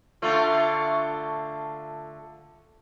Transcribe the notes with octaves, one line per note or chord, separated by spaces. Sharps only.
D3 A3 F4